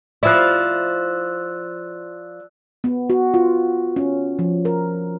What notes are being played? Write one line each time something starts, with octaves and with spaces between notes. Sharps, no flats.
F3 E4 D5 E6 F#6
B3
F#4
F4
C#4
F3
A#4